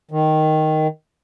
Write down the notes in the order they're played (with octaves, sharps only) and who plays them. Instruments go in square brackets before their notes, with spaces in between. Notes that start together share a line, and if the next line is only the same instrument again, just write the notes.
[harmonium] D#3